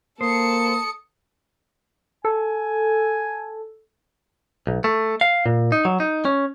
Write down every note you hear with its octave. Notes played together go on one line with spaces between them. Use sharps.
A#3 A4 C5 D#6 C#7
A4 G#5
B1
A3
F5
A#2
D#4
F#3
D#4
C#4